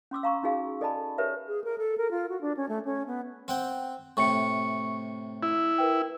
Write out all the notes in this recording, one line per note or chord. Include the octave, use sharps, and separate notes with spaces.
C#4 C6 D6 E6
F5 A#5 C#6 D6
C#4 D#4 F#4 G#4 F5
A4 D5 D#5 G#5 A5 B5
G4 A#4 B4 C#5 E5
G#4
A#4
A4
A#4
F4
F#4
D4
C#4
A3
C#4
B3
C4 F#5 G5
A2 C3 C#6 C#7
E4 E5
A#4 B4 G5